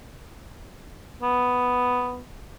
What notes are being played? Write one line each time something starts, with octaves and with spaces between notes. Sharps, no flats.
B3